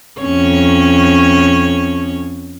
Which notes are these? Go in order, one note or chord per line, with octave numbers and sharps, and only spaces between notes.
F2 C#4 C#5